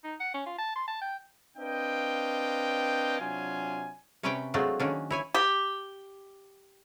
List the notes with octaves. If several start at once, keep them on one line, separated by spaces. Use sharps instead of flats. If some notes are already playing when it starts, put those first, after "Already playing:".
D#4
F#5
C#4
F4
A5
C6
A5
G5
C4 D4 B4 D#5 F5 G5
C3 F#3 D4 F4 G#5
C3 C#4 B4 C#5 D5 G5
F#3 G#3 A3 C4 D4 F4
D#3 A#3 C#4 D4
E4 C#5 G#5
G4